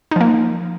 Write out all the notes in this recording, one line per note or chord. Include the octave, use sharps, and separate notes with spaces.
F3 A#3 D#4